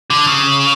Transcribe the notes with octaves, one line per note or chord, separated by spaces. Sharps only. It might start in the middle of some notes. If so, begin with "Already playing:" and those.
D3
C#3